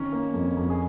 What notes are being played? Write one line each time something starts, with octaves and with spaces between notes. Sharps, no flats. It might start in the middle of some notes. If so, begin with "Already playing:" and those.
Already playing: D#3 C#4 D#4 C#5
A#3
F2
F2
G#4